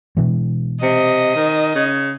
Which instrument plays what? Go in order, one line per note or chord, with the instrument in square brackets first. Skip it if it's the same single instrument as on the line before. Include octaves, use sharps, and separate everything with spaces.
[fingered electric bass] B2 E3 G#3
[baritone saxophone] C3 [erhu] D#5
[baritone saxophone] D#3
C#3